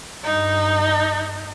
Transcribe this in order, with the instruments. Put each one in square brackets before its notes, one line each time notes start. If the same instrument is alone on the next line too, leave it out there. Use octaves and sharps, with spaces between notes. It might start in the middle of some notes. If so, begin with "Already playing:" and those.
[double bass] G2 [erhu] D#4